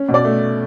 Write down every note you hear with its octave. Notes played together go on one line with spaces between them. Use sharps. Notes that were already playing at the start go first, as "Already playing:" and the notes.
Already playing: C#4
B2
D5
A3